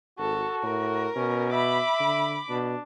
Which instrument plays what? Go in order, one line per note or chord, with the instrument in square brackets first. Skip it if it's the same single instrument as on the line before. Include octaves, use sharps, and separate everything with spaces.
[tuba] G#1 [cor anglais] F#4 [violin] A4
[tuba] A2 [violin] A#4
[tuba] B2 [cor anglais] C#4
[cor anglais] E5 [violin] B5 D6
[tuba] D3
[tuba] B2 [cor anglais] D4